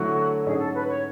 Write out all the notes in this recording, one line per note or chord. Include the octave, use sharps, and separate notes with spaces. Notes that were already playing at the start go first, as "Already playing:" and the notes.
Already playing: D3 F#3 A3 E4 F#4
G#2 F#3 C#4 G#4
A4
B4
C#5